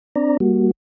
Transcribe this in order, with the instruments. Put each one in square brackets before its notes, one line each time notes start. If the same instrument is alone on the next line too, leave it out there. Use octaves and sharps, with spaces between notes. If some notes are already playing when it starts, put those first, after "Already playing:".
[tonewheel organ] C4 D4 D5 A#5
G3 A#3 F#4